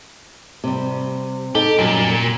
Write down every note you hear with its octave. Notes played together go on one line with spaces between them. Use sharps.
C3 G3
D#4 G4 A4
F#2 A#2 G3